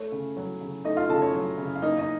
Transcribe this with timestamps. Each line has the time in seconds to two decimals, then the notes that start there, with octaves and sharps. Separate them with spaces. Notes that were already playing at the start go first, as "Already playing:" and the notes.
Already playing: A3 C#5
0.12 C#3
0.37 F#3
0.61 C#3
0.84 A3 D#4 D#5
0.97 F4 F5
1.09 C#3 A4 A5
1.22 C#5
1.33 F#3
1.58 C#3
1.75 F5
1.82 A#3 D#4 D#5
1.98 D#4 D#5